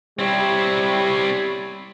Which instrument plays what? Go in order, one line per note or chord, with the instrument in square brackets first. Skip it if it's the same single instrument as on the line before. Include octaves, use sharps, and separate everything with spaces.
[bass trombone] G3 [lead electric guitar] C4 E4 [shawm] C#5